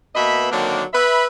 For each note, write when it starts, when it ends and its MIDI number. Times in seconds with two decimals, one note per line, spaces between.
0.15 0.49 47
0.15 0.49 58
0.15 0.49 59
0.15 0.49 75
0.15 0.49 76
0.15 0.49 83
0.51 0.83 50
0.51 0.83 51
0.51 0.83 54
0.51 0.83 58
0.51 0.83 60
0.51 0.83 62
0.94 1.26 71
0.94 1.26 76
0.94 1.26 83